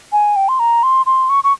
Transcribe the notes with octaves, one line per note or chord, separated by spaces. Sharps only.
G#5
G5
C6
A#5
C6
C6
C#6
C#6